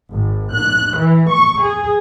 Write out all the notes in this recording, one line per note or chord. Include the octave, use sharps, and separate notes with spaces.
G#1
F#6
E3
C#6
G#4